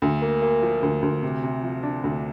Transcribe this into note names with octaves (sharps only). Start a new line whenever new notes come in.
D2
A#3
A#3
F3
D2
D2
C3
C3
F3
D4
D2